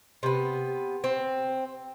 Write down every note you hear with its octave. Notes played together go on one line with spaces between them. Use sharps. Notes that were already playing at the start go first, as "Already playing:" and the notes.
C3 B3
C4